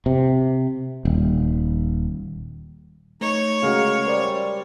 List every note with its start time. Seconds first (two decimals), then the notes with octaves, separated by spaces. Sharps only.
0.06 C3
1.05 D#1
3.21 A3 D#4 C#5
3.62 C#3 G#3 F#4 A#4 F5
4.07 G3 A#4 C5 D5